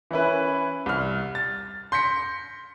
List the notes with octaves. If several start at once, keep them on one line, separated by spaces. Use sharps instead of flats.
E3 C#4 E4 B4
C2 F6
A6
C6 G6 A#6 B6 C#7